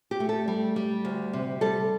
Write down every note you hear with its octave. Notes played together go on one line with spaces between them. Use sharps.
G4
A3
A4
G3
G3
D2
C3
G3 A4